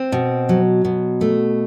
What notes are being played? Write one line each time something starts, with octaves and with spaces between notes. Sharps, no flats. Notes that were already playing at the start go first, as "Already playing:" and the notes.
Already playing: C4
B2
F#3
B2
A3